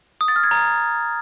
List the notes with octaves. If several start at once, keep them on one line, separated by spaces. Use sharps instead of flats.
D#6
A6
F6
G#6
A#5